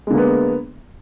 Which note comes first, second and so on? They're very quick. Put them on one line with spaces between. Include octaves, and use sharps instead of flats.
G#3 D3 A#3 B3